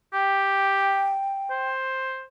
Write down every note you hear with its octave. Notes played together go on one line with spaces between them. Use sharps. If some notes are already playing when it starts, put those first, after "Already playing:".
G4 G5
C5